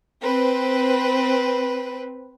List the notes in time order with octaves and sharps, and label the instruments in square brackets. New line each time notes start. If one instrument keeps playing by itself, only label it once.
[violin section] C4 B4